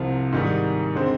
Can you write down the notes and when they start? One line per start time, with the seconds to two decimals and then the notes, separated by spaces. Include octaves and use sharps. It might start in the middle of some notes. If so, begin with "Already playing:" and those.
Already playing: C2 C3 F3
0.32 G#2 D#3 G3
0.95 D3 G#3 C4